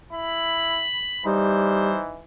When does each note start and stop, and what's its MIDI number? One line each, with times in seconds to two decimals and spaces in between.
0.13 0.85 64
0.13 1.22 83
1.26 2.24 52
1.26 1.99 55
1.26 2.19 63
1.26 2.02 72